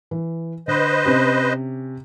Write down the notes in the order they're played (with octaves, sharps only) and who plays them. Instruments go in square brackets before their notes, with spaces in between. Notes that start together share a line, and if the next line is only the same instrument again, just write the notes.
[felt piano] E3
[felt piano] D3 [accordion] B4 C5 D#5
[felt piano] C3 C#4 G4